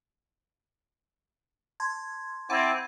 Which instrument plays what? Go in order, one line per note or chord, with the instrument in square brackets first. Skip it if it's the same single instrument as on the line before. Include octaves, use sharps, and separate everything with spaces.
[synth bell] A5 C6 G#6
[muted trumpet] C4 [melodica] E4 A5 D6 [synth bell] F#5 G#6 D#7